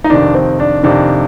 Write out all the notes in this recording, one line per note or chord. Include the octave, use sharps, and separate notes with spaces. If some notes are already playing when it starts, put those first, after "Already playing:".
D#4
F2 C3 D#3 D4
C4
D4
F2 C3 D#3 D4